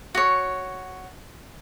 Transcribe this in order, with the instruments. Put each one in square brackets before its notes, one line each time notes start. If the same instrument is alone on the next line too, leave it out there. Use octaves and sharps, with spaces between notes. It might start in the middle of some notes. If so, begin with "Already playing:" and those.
[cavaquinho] F#4 C#5